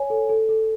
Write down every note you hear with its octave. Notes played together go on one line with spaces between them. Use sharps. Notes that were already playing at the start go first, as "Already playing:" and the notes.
Already playing: C#5 G#5
A4
A4
A4